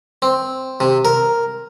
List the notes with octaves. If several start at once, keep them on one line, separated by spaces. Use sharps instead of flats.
C4
C3
A#4